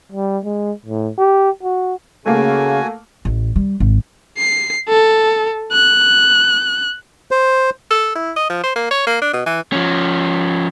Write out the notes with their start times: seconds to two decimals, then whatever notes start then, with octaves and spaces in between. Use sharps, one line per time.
0.12 G3
0.44 G#3
0.86 A2
1.18 G4
1.63 F#4
2.26 C#3 A3 A#3 F#4 G#5
3.25 A1
3.56 G3
3.80 G#1
4.38 C7
4.89 A4
5.72 F#6
7.31 C5
7.91 A4
8.15 E4
8.36 D#5
8.50 F3
8.63 C5
8.76 A#3
8.91 C#5
9.07 A#3
9.22 D4
9.33 B2
9.46 E3
9.72 F3 C#4